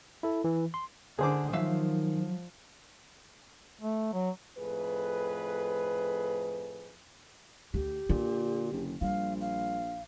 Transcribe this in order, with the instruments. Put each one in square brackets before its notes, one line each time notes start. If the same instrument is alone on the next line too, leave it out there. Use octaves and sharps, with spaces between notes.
[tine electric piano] E4 A4
E3
C6
[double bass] D3 [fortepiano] G#4 C5 D6
[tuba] D#3 [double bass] F3 [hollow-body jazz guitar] F#3 E5 F5
[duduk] A3
F#3
[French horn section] F2 A2 G#4 B4
[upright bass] D2 [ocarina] G4
[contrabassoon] A#2 [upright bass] D3
[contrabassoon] F#1
[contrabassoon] A#1 [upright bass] G3 [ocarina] F5
[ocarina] F5